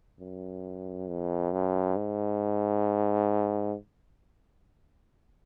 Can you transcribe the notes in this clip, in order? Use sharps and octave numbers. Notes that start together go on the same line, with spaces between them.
F#2
F2
F#2
G#2